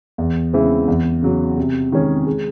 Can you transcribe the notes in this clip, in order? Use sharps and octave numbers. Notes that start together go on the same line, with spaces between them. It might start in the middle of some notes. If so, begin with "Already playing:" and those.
E2
C#3 E3 G#3 C4
E2
C#3 F#3
C3
D#3 G#3 C#4 G#4
G#3